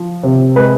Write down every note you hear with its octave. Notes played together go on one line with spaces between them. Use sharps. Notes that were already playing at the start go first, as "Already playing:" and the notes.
Already playing: F3
C3
G#3 B4